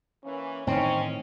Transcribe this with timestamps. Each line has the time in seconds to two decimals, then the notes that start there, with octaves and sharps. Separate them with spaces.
0.24 E3 A#3 C#4
0.67 A2 D#3 E3 C4 C#4 D#4